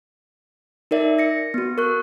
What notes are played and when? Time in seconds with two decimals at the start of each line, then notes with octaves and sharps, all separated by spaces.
0.91 D#4 A#4 D5 E5
1.18 A#6 C#7
1.54 B3 F#4
1.78 A#4 C#6 F#6